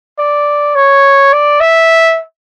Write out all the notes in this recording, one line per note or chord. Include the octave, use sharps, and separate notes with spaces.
D5
C#5
D5
E5